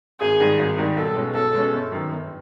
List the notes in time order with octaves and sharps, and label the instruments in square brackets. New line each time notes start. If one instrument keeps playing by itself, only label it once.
[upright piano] G#1 [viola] G#4
[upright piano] G#2 D#3 G3
G#1
G#2 D#3 G3
[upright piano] B1 [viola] A4
[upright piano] B2 G#3 C#4
[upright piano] B1 [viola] A4
[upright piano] B2 G#3 C#4
G1
F#2 D#3
G1